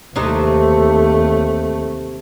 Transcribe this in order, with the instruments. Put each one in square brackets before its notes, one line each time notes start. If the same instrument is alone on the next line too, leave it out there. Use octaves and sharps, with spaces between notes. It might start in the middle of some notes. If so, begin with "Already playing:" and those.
[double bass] D#2 A3 [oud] C3 E3 D#4